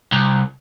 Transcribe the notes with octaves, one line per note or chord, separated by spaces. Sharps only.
C2